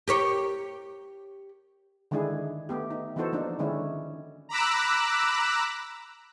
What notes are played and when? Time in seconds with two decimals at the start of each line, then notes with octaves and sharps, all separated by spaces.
0.07 G4 A#4 C#5
2.11 D3 D#3 G#3 D4 E4 G#4
2.69 A3 B3 G4
2.91 D#4
3.16 E3 B3 D#4 F#4 A4 C5
3.33 F3 A#3 D4 D#4
3.59 D3 D#3 G#3 C#4 D4 E4
4.49 A#5 B5 D6 E6 F#6